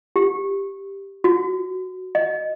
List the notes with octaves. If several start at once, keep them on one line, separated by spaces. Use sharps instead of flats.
G4
F#4
D#5